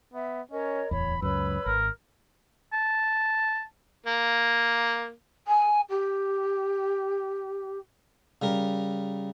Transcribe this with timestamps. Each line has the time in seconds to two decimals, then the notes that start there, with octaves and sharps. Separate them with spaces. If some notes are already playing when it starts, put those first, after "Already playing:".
0.13 B3 E5
0.51 C#4 A#4 C#5 D#5
0.91 D1 E2 C#5 B5
1.22 C#2 F#2 B4 C#5 B5 E6
1.66 G#1 A#4
2.73 A5
4.07 A#3
5.48 G#5
5.90 G4
8.42 C#3 G3 A#4